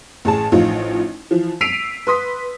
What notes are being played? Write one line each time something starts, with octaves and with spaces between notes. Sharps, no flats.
A1 G#4 A5
A1 F3 D#4 F4
E3 F3
E6 B6 C7 D7 D#7 F7
B4 C6 D#6 B6